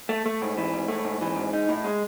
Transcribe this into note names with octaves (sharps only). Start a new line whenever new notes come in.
A3
A3
G#2
E3
G#2
A3
G#2
E3
G#2
D#4
A2
G#3